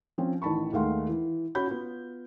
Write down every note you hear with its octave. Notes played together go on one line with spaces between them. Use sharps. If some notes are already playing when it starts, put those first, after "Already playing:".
F3 C4 C#4
A1 D#3 A5 B5 C#6
D#2 G#3 A3 F5 F#5 C6
E3
C#4 F#4 C#5 B5 G6
B3 F4